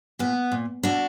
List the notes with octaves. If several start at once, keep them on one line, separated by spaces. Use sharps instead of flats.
A#2 B3
A#2
B2 D4 F#4